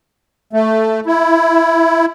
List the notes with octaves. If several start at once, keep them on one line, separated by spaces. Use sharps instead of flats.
A3
E4